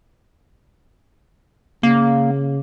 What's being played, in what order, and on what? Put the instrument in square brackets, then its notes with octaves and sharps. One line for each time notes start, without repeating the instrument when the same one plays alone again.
[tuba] C#3 [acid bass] A#3